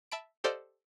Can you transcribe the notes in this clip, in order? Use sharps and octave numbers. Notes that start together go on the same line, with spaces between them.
E5 A5 B5 D7
G4 A4 C5 D5 D#5 F5